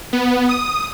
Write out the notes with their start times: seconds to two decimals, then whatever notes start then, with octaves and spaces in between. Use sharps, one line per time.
0.13 B3
0.49 D#6